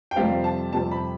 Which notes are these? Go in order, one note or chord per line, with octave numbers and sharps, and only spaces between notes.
G5
F2 C3 G3 C4 F5
A5
F2 C3 G3 C4 A5
B5